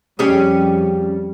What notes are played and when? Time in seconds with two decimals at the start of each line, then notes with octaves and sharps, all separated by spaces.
0.19 F2 G3 C#4 G4 G#4